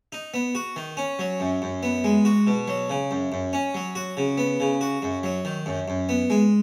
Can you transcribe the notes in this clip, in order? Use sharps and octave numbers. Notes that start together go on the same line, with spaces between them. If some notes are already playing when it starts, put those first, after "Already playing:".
D#4
B3
F#4
D#3
C#4
F#3
F#2
F#2
B3
G#3
F#4
B2
F#3
C#3
F#2
F#2
C#4
F#3
F#4
C#3
B3
C#3
F#4
F#2
F#3
D#3
F#2
F#2
B3
G#3